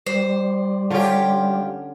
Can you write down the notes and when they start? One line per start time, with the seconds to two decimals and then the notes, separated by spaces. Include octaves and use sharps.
0.06 G3 C5
0.90 D3 C#4 F4 G4